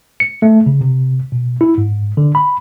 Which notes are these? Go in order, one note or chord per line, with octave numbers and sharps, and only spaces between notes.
C#7
A3
C#3
C3
B2
E4
G#2
D3
B5